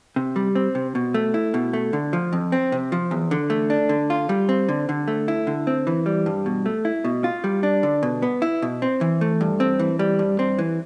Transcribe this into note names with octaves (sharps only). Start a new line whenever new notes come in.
C3
G3
C4
C3
B2
A3
E4
B2
A3
D3
F3
F2
C4
C3
F3
E2
D3
A3
D4
D3
F4
G3
C4
D3
D3
A3
E4
D3
C4
E3
G3
G2
B2
A3
E4
B2
F4
G3
D4
D3
B2
B3
E4
B2
C4
E3
A3
G2
C4
E3
G3
G2
C4
E3